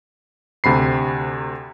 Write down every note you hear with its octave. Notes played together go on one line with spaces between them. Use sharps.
D2 C3 B5 C7